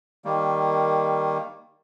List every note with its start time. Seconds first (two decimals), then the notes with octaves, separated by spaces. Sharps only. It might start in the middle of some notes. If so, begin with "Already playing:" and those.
0.25 D#3 G3 A#3